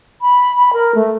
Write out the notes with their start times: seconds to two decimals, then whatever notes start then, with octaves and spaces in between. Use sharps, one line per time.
0.22 B5
0.56 B5
0.73 A#4
0.95 A3